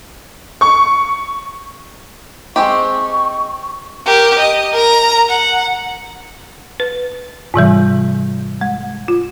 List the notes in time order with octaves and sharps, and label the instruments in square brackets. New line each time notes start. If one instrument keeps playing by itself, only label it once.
[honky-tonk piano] C#6
[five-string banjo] G#3 C4 G4 [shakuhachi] C#6
[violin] G4 A#4
D#5
A#4 A#5
F#5
[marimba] B4
G#2 C3 E3 G3
G#3
F4